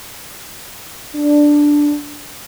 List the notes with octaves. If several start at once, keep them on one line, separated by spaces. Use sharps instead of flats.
D4